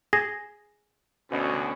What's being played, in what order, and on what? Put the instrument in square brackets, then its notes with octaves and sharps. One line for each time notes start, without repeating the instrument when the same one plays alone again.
[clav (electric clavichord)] G#4 [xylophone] A#6
[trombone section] D2 B2 [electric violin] C#4